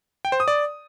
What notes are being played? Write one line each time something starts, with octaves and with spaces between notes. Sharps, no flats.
G5
C5
D#6
D5